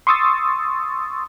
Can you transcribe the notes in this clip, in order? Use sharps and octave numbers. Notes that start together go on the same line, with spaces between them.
C6 C#6 D#6 E6 A6